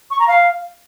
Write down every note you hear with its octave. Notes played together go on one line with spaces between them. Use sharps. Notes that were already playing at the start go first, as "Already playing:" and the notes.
C#6
A#5
F5